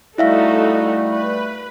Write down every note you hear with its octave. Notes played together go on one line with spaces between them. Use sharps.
G3 A3 D#4 E4 F#4 A4 E5 F5
B4